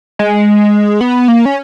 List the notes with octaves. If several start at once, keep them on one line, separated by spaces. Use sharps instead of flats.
G#3
B3
A#3
C#4